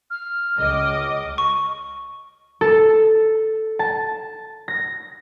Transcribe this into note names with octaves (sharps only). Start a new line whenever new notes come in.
F6
C#2 D#5 D6
C#6
A4
A5
A#6